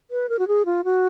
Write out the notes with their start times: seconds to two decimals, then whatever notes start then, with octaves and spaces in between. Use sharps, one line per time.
0.11 B4
0.29 A#4
0.39 F#4
0.48 G#4
0.65 F4
0.84 F#4